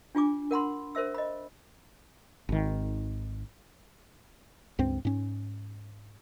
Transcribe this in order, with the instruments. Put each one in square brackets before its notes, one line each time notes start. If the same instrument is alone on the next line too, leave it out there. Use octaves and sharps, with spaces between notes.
[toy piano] D4 F4 G#5 D6
A#4 F#5 B5 C6
A#4 C5 E5 E6
D#5 B5
[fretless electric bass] G#1 D#3
C#2 G2 C4
G#2 C#4